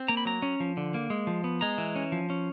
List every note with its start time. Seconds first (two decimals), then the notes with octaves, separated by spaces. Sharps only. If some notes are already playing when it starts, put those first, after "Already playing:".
Already playing: C4
0.08 A#3 A#5
0.17 B5
0.25 F#3 A#5
0.42 C#4
0.60 F3
0.77 D3
0.94 A#3
1.10 G#3
1.27 F3
1.44 B3
1.61 G#3 A#5
1.78 E3
1.96 C#4
2.12 F3
2.30 C#4